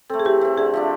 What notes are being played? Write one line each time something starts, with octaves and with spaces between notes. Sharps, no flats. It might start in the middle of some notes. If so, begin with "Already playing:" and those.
A3 C4 A4
G#4
E3 G4
A3 C4
D3 G#4
F3 A3 D4